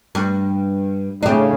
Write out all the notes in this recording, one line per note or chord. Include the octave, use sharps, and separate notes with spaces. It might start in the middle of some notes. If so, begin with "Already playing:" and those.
G2
A2 C#3 D4 G4